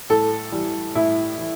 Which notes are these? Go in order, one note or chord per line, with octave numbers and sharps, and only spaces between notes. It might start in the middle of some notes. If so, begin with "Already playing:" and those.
A2 A4
E3 G3
A2 E4
E3